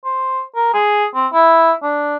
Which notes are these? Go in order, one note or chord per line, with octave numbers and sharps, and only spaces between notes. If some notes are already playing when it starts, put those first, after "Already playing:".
C5
A#4
G#4
C4
E4
D4